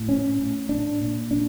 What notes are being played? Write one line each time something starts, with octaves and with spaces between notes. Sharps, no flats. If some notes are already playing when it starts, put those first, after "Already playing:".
Already playing: A2
C#4
A2
D4
A#2
D4